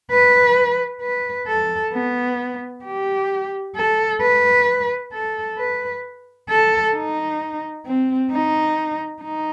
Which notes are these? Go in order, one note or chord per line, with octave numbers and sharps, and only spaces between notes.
B4
B4
A4
B3
G4
A4
B4
A4
B4
A4
D#4
C4
D#4
D#4